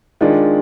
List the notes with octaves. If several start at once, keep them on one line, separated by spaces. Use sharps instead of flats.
D#3 G#3 D4 F4